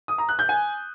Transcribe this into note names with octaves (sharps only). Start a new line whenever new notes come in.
D#6
A#5
F#6
G6
G#5